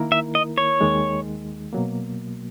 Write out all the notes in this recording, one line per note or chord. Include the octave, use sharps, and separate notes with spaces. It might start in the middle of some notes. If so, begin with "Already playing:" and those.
Already playing: D#3 A#3 E4 A#4
E5
D#5
C#5
D#2 D#3 G#3
B2 F#3 A#3